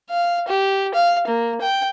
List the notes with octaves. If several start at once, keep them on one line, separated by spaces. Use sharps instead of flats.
F5
G4
F5
A#3
G5